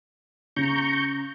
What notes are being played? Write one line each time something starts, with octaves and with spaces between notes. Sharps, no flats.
C#3 A#5 C#6 G6